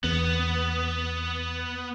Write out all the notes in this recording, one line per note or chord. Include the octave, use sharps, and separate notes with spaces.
E2 B3